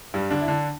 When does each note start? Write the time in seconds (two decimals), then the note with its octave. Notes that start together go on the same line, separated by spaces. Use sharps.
0.14 G2 G3
0.31 D3 D4
0.41 E4
0.48 D3 D4